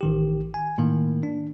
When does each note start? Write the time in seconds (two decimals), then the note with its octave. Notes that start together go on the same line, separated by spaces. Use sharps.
0.01 A1 D#3 G4
0.54 G#5
0.78 A2 D#3 A#3
1.23 D4